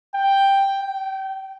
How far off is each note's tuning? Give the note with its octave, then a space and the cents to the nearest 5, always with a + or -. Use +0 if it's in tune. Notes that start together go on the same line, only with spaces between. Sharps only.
G5 +5
G5 -30